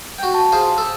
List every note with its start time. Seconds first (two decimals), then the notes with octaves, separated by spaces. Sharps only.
0.19 F#4 G5
0.34 A5
0.52 F4 G#4 C5
0.78 A4 E6